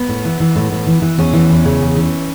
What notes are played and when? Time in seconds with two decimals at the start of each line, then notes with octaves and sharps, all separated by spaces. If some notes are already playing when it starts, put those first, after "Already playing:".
Already playing: B3
0.09 A2
0.25 E3
0.40 E3
0.56 A2
0.72 A2
0.87 E3
1.02 E3
1.18 E2 C#4
1.33 E3
1.50 E2
1.65 C#3
1.81 E2
1.96 E3